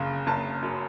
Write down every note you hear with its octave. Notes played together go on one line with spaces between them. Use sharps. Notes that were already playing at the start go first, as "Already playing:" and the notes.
Already playing: F#1 C#3
F#1 A5
F#2